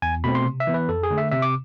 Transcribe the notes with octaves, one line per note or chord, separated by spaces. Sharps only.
E2 G#5
B2 A3 C4 B5
C6
C3
E5
E3 B3
B4
F2 A4
G#4
D3 A3
E5
C3 E5
D6